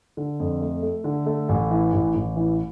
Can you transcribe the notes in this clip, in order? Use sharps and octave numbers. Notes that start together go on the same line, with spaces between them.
D3
F2
A3
A3
D3
A3
A1
E3
A1
A1
E3